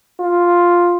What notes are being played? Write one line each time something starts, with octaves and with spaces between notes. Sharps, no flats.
F4